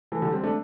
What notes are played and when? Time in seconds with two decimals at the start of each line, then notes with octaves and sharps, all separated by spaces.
0.12 E3 A3
0.22 D3 G3
0.32 G3 C4
0.44 A3 D4